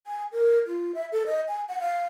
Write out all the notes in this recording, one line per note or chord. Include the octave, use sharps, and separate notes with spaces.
G#5
A#4
F4
E5
A4
D#5
G#5
F#5
F5